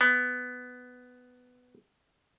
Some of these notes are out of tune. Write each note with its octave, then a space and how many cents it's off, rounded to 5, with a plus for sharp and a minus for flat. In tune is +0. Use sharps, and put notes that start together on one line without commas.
B3 +10